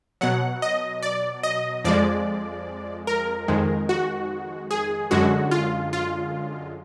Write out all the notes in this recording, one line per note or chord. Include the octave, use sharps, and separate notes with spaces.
B2 F#3 F#5
D#5
D5
D#5
F2 F3 G#3 D5
A#4
F2 D#3 G#3
F#4
G#4
F#2 D3 G#3 F#4
F4
F4